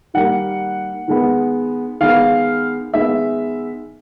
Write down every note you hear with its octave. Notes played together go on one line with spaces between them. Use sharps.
D#3 G3 A#3 F#5
D#3 G#3 B3
D#3 G#3 B3 F5
D#3 G#3 B3 E5